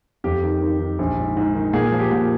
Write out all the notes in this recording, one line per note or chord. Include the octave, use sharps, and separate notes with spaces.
F2 G4
D#3
D#3
D#3
A#1
G#2
G#2
D#3
A#2 G#4
F3
G4
A#2